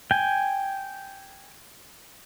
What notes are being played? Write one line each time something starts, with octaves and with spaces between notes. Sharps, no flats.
G5 G#5